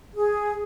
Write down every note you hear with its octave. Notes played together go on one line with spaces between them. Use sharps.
G#4